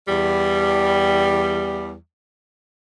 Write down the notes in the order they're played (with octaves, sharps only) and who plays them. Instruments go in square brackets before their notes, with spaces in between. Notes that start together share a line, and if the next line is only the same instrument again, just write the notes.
[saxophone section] E2 G3